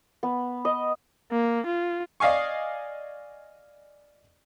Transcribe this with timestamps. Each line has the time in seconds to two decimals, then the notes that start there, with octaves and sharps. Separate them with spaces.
0.23 B3
0.65 D#5
1.32 A#3
1.66 F4
2.20 D5 D#5 F5 G#5 C#6